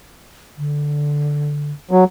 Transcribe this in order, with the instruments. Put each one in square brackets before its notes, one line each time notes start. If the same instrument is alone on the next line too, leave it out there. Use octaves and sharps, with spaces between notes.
[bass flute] D3
[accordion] F#3